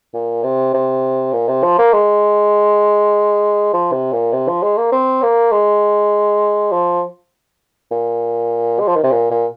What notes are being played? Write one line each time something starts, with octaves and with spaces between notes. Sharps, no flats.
A#2
C3
C3
A#2
C3
F3
A#3
G#3
F3
C3
A#2
C3
F3
G#3
A#3
C4
A#3
G#3
F3
A#2
G#3
F3
D#3
C3
A#2
A#2